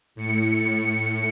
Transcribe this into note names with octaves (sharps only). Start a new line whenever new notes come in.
A2 C#7